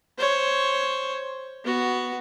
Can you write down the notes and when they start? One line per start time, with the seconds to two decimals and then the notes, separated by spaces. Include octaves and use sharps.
0.18 C5 C#5
1.64 B3 F#4